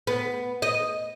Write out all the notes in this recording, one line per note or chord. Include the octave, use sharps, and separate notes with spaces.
B3
D#5